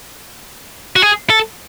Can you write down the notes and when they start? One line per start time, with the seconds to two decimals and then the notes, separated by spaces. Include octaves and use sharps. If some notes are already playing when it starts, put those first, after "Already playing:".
0.96 F#4
1.02 G#4
1.30 A4